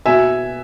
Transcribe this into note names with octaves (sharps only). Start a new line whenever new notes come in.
B2 E5 G#5